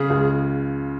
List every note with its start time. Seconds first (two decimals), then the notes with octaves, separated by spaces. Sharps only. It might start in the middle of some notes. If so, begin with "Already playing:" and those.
Already playing: C#3 G#4
0.10 C#2